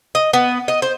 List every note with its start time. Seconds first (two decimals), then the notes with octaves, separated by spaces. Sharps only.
0.15 D#5
0.33 B3
0.68 D#5
0.82 C5